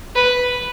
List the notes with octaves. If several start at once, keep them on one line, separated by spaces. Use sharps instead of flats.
B4